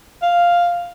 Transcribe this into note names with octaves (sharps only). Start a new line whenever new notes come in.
F5